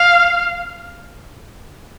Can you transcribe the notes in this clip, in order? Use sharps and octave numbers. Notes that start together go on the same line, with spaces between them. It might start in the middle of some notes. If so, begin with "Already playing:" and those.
Already playing: F5